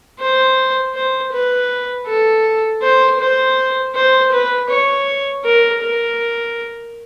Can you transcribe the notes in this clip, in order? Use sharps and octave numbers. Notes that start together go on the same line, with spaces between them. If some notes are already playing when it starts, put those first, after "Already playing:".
C5
C5
B4
A4
C5
C5
C5
B4
C#5
A#4
A#4